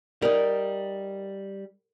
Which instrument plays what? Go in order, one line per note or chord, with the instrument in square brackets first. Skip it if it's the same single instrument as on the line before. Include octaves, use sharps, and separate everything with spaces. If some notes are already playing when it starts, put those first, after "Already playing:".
[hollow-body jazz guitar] G3 D#4 [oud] A#4